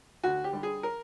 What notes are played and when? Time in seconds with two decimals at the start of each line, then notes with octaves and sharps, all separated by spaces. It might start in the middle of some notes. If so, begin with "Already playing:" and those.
0.24 D2 F#4
0.44 G4
0.53 D3 G3
0.63 G#4
0.83 A#4